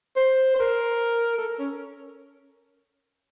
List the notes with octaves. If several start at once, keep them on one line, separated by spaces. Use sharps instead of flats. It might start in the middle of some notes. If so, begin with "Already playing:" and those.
C5
C5
A#4
A4
A#4
C#4